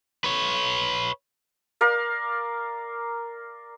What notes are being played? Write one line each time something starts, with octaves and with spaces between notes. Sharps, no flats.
B4 C#5
A#4 D5 F5